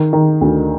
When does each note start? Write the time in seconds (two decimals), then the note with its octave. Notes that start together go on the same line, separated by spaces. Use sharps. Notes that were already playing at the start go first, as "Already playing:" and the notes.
Already playing: D#3
0.13 D#3
0.41 D2